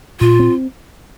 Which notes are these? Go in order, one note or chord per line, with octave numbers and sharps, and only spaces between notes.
A#2 F4
C4